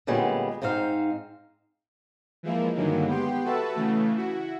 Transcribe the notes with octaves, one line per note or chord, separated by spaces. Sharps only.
A#2 D3 G3 G#3 B3 C#4
G#2 C4 D#4 C5 F5
E3 F3 G#3 A#3 E4
G2 D3 D#3 F#3 G#3 A#3
B3 G4 G5 C6
F#4 A4 B4 E5 A5
C#3 E3 A3
E4 F#4